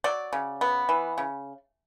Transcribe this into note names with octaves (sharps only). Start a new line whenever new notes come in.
F#3 D5
C#3
B3
E3
C#3